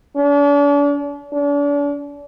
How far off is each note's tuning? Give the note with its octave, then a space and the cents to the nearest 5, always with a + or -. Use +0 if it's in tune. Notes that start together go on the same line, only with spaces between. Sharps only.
D4 -40
D4 -40